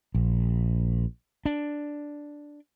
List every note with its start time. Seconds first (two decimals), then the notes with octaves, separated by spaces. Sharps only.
0.15 A#1
1.45 D4